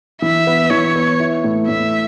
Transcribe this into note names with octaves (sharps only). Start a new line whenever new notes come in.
E3 E5
B3
E3 C#5
B3
E4
A2
A2 E5